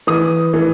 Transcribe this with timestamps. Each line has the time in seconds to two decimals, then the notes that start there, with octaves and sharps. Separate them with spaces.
0.07 E3 D#6
0.54 E3